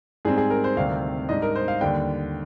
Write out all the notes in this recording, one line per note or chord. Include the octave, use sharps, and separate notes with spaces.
G#2 G3 C4 G#4
G#4
A#4
C5
D2 C3 D#3 G3 C4 F5
G#2 G3 D4 D#5
A#4
C5
F5
D#2 D3 G3 G5